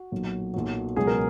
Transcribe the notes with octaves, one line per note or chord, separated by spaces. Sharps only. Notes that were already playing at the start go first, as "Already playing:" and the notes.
Already playing: F#4
B1 A#2 F#3
B1 A#2 F#3
C#2 B2 F#3 G#4
A#4